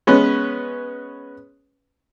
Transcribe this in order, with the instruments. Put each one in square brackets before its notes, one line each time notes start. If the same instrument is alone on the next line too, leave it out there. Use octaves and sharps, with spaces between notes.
[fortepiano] G#3 B3 C#4 B4